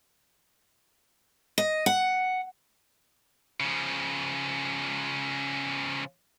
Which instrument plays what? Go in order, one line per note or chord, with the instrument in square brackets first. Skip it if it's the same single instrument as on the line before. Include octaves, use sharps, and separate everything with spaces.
[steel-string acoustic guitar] D#5
F#5
[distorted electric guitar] C#3 F3